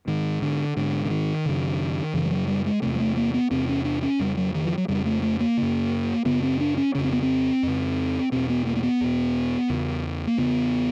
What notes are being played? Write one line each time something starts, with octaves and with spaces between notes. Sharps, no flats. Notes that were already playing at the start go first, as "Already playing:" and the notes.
G#2 D#3
D3
G#2 D3
D3
D#3
F#2 C#3
F#2 C#3 E3
G3
F#3
G3
G#3
E2 C3 A3
G#3
A3
A#3
B3
E2 C3 C4
C#4
D4
C#4
F2 C#3 G3
F#3
D#3
F3
F#3
F2 C#3 G3
A3
A3
A#3
F#2 C#3
F#2 C#3 B3
C4
D4
C#4
F2 C#3 C#4
C4
B3
C4
F2 C#3
E2 B2 C4
B3
A#3
A#3
B3
E2 B2
E2 C#3
A#3
E2 C#3 B3